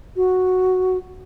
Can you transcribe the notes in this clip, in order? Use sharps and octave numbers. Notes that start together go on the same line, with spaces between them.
F#4